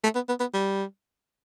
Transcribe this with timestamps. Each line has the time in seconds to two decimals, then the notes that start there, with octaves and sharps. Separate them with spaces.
0.04 A3
0.15 B3
0.29 B3
0.40 B3
0.54 G3